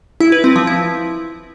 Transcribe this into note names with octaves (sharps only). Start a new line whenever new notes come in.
E4
B4
C4
F3
E4